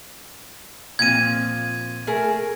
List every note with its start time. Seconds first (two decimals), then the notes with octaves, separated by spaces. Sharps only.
0.99 A#2 F3 C4 G#6 D#7
2.07 A3 G#4 A#4